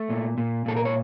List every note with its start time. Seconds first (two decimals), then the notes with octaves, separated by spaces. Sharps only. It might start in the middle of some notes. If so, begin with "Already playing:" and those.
Already playing: A3
0.10 A#2
0.38 A#2
0.66 A#2 A4
0.76 A#4
0.85 C#5